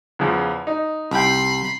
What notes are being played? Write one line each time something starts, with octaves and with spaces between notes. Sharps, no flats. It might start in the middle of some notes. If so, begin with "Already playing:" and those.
E2 C#3 F3
D#4
C2 G5 B5 C6